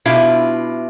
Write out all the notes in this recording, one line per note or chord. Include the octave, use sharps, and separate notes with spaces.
B2 D4 E4 F4 E5 F5